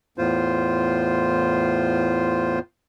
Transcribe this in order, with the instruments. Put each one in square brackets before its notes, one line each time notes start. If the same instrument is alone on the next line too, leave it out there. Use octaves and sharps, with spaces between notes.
[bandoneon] E2 A2 F4 C5